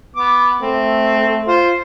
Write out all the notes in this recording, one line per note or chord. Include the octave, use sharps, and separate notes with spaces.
B3 D6
A3 C4
F4 C5